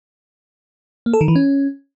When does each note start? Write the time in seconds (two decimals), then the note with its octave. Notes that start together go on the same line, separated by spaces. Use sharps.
1.06 A#3
1.13 A4
1.21 D#3
1.28 E3
1.36 C#4